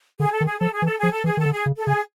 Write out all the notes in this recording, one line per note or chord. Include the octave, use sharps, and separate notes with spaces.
D3 G#4
A4
D#3
G#4
F3 A4
G#4
E3
A4
F3 G#4
A4
E3 G#4
D#3 A4
D3
G#4
C#3
A4
C#3 G#4